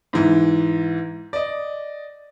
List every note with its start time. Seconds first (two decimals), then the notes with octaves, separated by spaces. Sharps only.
0.13 G#2 E3
1.33 D5 D#5